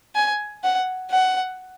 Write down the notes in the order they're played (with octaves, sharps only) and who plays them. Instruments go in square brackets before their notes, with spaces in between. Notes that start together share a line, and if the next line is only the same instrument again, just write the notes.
[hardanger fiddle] G#5
F#5
F#5